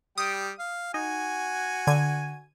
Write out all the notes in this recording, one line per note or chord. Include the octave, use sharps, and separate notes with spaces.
G3 G5 D#6
F5
D#4 F#4 G#5
D3 G#6 D#7